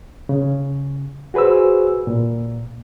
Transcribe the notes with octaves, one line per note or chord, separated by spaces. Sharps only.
C#3
F#4 G#4 B4 C5 E6
A#2